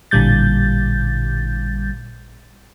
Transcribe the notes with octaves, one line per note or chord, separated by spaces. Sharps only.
A1 A#2 D3 G3 G6 A6